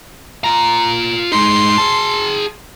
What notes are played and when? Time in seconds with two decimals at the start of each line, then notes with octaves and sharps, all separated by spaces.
0.44 F4 A#5
1.32 G#3 D#4 C6
1.78 G#4 A5